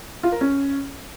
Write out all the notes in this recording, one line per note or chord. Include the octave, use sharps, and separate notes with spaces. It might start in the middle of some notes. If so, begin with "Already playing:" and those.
F4
A#4
C#4